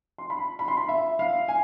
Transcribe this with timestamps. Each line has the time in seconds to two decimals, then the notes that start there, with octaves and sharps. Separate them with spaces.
0.18 C6
0.30 B5
0.59 B5
0.68 C6
0.77 B5
0.89 E5
1.19 F5
1.48 G#5